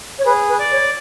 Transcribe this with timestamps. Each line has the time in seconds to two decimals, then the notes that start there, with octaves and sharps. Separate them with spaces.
0.18 C#5
0.25 G#4 B4
0.48 B4
0.59 D5
0.71 C#5